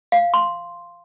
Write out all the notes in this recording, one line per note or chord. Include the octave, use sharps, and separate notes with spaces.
F5
C6